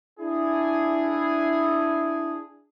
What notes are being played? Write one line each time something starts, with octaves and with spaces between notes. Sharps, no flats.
D4 E4 G#4